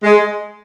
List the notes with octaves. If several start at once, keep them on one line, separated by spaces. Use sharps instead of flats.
G#3